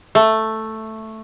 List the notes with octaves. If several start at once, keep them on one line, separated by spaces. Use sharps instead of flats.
A3